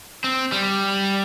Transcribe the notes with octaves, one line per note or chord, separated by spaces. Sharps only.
C4
G3